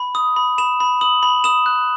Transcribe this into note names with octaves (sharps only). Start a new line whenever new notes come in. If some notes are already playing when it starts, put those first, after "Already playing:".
Already playing: B5
D#6
B5
B5 E7
B5
D#6 F#7
B5
D#6 E7
F#6